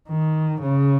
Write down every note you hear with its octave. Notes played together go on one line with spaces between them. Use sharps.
D#3
C#3